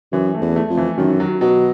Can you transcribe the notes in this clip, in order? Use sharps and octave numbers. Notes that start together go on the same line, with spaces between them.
F#2 E3
A3
E2
A3
F2
E3
F#2 D#3
F#3
B2 F#3